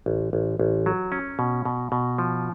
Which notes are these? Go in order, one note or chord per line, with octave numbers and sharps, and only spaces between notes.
A1
A1
A1
F#3
C#4
B2
B2
B2
F3